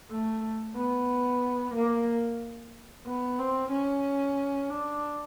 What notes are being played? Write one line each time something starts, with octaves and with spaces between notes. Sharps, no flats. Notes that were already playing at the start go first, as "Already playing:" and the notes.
A3
B3
A#3
B3
C4
C#4
D4